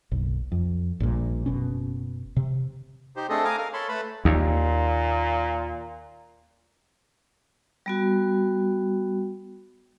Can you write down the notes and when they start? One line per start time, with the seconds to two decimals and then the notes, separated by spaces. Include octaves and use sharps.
0.11 F#1 B1
0.52 F2
1.00 A#1 G2 A#2
1.46 F#1 B2 C#4
2.36 C3
3.16 D#4 G4 C5
3.29 A3 C4 D4 G#4 A4 D#5
3.45 F5 G#5 A#5 D6 D#6 F6
3.58 A#4 F5
3.73 A4 C#5 A5 B5 C6
3.88 A3 B4 A5 B5
4.25 D#2 A#2
7.86 G3 B3 F#4